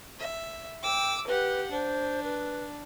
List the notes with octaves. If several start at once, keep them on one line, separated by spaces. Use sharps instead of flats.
E5
G5 D6 E6
G4 B4 F#5
D4 C5
B4